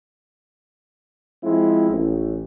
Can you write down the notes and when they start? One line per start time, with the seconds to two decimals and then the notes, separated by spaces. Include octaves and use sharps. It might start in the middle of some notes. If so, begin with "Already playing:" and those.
1.43 F3 G#3 C4 E4
1.90 A1